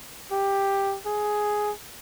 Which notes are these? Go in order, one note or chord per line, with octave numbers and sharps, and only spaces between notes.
G4
G#4